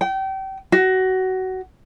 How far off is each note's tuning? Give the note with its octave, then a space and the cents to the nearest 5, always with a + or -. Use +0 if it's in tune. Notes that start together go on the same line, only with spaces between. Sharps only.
G5 -30
F#4 +20